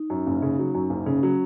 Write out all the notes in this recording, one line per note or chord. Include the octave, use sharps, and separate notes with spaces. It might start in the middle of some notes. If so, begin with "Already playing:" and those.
Already playing: D#4
F#2
F#1
C#3
F#3
F#2
F#1
C#3 C#4
F#3